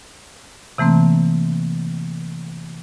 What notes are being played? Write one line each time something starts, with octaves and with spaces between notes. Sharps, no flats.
C3 E3 A3 A#3 C4